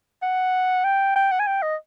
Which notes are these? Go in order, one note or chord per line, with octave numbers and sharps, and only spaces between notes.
F#5
G5
G5
F#5
G#5
G5
D#5